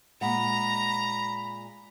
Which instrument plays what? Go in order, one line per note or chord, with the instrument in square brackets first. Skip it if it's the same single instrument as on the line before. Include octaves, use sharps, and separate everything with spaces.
[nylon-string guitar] A#2 G#3 F#5 [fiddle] A#5 [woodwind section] B5